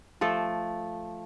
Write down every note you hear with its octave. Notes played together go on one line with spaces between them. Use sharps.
F3 A3 A4